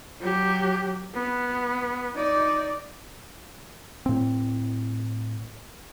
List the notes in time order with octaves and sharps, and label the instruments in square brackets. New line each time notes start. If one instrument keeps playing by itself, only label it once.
[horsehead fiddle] F#3 G4
B3
D#4 D5
[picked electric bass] A2 C4